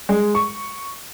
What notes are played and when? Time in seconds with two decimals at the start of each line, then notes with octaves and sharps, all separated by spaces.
0.09 G#3
0.35 C#6